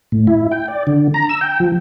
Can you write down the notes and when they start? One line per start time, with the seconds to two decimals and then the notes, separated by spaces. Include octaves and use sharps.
0.12 A2
0.27 E4
0.51 G5
0.68 D5
0.87 D3
1.14 A#5
1.29 E6
1.41 G5
1.60 F3